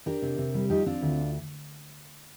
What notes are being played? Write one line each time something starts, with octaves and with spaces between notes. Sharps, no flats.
D4 G4 A#4
C3
C3
G3
F3 D#4 G4
C4 D4 F4
D2